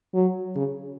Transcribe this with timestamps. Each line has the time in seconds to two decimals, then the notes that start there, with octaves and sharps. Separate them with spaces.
0.14 F#3
0.56 C#3